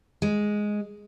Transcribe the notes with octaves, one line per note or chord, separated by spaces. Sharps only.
G#3